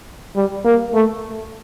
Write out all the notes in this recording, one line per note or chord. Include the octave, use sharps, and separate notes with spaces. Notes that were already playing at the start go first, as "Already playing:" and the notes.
G3
A#3
A3